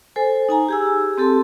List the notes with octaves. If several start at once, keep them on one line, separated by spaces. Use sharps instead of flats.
A4 C5 G#5
D#4 G#5 A#5
G4 G#4 E6
C4 G4 A4 A5 C6